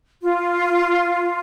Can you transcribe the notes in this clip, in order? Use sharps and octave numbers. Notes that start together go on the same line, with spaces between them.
F4